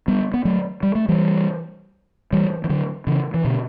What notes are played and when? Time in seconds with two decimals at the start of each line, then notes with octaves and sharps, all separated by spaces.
0.08 G3 B3
0.34 B3
0.45 F#3 A3
0.83 G3
0.95 A3
1.08 E3 G3
2.33 E3 G3
2.64 E3
2.69 D3 F#3
3.07 C#3 E3
3.34 E3
3.44 B2 D3